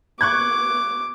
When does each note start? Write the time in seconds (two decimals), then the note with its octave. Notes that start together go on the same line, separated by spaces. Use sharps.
0.21 C#6 D6 F#6 G#6